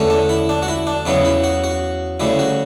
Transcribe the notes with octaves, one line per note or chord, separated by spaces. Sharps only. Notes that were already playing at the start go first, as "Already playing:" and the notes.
Already playing: E2 D3 A3 C#4
D4
E4
D4
F#4
E4
D4
E2 C#3 F#3 B3 E4
E4
F#4
F#4
D2 C#3 G3 E4
F#4